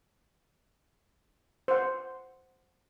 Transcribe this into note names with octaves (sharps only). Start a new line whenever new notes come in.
C5 F#5